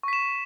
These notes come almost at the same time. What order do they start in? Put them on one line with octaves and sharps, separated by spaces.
C#6 B6 E7